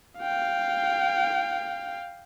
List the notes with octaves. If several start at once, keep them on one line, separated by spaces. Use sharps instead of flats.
F5 G5